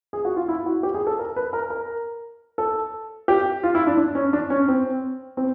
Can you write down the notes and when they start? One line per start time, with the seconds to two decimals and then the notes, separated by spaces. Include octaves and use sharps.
0.13 G#4
0.25 F#4
0.36 F4
0.48 E4
0.66 F#4
0.83 G4
0.94 G#4
1.07 A4
1.19 A#4
1.36 B4
1.53 A#4
1.70 A#4
2.58 A4
3.28 G4
3.63 F4
3.75 E4
3.87 D4
3.97 D4
4.15 C#4
4.33 D4
4.50 C#4
4.68 C4
5.37 C4